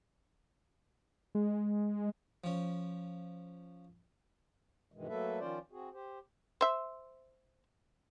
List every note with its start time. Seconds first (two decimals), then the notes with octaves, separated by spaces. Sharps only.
1.35 G#3
2.44 F3 C#4
4.92 G2 B2 D#3 E3 G#3
5.08 F#3 A3 A#3 A4 B4 E5
5.39 D#3 F3 C#4 F4 C5 D5
5.71 C4 F#4 G#4
5.93 G4 C5
6.61 C5 E5